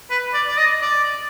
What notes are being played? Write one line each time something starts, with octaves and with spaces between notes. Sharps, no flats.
B4
D5
D5
D#5
D5